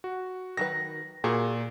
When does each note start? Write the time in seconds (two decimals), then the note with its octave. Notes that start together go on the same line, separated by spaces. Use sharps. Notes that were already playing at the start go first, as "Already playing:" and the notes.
0.04 F#4
0.57 D#3 F#3 B4 A#6
1.24 A#2 F#4 G#4 A#4